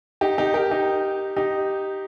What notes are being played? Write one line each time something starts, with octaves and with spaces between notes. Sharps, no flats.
D#4 G4
D#4 G4
G4 A#4
D#4 G4
D#4 G4